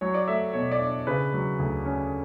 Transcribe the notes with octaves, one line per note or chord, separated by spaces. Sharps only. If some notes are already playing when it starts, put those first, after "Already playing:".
F#3 C#5
D5
A3 E5
B2 C#5
D5
D4
C#3 B4
F#3
D2
C#4